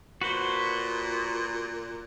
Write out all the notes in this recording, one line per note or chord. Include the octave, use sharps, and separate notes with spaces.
A#2 F#4 B4 C5